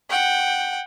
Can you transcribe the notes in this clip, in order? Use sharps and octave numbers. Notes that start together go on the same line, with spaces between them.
F#5 G5